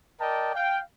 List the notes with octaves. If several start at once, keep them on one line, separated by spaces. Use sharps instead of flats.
A#4 D5 D#5 G5 A5
F5 G5